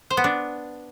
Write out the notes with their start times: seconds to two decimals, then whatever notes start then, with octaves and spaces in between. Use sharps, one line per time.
0.10 C5
0.17 B3
0.24 D4